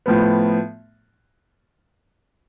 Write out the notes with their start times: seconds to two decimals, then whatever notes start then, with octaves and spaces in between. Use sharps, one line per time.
0.06 A2 F3 B3